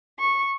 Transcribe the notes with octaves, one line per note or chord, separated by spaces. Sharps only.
C#6